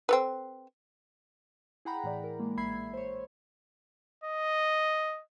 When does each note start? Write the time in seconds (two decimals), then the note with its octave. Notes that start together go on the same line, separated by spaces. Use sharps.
0.09 C4 A4 B4
1.85 E4 G#4 F#5 G5 A#5 B5
2.04 A2 E3 D5
2.24 A#4
2.40 G#3 A#3
2.57 A#1 E5 B5 G#6 C7
2.94 C5 C#5
4.24 D#5